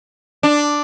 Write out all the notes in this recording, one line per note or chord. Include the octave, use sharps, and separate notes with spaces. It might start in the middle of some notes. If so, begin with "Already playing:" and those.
D4